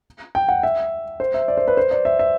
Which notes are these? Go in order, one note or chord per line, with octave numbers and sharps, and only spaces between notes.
G5
F#5
E5
C5
E5
D5
C5
B4
C5
D5
E5
E5